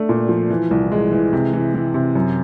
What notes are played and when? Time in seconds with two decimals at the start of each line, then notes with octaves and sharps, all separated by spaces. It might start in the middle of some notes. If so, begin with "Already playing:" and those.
Already playing: A3 D4
0.09 A#2
0.29 F3
0.50 E3
0.71 C2
0.92 G#3
1.12 E3
1.33 C3
1.53 E3
1.75 E3
1.94 C3
2.15 F#2